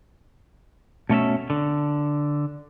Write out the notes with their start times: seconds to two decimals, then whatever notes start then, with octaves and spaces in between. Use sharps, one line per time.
1.09 B2 A3 C#4 E5
1.50 D3